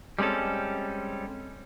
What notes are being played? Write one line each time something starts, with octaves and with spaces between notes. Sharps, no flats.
G3 G#3 C4 C#4 A4